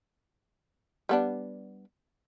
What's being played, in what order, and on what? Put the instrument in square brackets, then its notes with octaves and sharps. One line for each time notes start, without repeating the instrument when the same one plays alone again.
[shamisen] G3 B3 D4